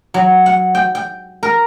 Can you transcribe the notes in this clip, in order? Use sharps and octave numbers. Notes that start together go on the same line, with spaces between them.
F#3
F#5
G5
G5
A#4